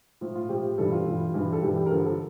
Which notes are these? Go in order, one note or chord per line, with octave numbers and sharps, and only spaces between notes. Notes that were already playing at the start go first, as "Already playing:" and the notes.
A2 F3
F4
A2 F3 G4
G2 E3 G3 A4
F4
G2 E3 G3
G2 E3 G3
A4
G2 E3 G3 G4
G4
A#4
G2 D3 F3 A4
A4